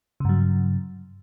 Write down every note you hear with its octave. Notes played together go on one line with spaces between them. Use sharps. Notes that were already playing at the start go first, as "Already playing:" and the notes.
G2 C#3 F#3